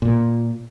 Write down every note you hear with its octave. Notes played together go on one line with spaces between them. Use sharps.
A#2